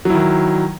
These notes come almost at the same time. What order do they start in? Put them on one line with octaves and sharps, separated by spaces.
F#3 E4 D#3